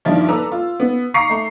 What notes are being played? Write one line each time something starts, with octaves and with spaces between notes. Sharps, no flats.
G2 D#3 F3 D4 E4 F4
A4 B4 A#5 D6 E6
F4
B3
F5 A#5 C#6 D6 C7 C#7
A3 A#5